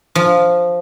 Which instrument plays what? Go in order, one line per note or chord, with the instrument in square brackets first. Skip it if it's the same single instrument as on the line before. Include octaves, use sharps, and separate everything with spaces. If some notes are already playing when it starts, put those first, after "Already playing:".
[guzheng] F3